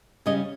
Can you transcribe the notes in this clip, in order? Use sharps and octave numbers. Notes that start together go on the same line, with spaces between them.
C#3 G3 C#4 D#5